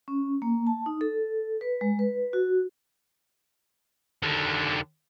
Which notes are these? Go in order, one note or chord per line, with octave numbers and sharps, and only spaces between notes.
C#4
A#3
A5
D#4
A4
B4
G#3
B4
F#4
D#2 D3